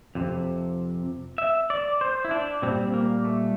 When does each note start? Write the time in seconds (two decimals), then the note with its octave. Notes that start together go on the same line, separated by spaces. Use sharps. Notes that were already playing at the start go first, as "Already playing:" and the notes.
0.15 F2 C3
1.38 E5
1.70 D5
2.01 C5
2.25 E4
2.31 D4
2.62 A#2 G3 C4
2.94 A#3
3.24 A3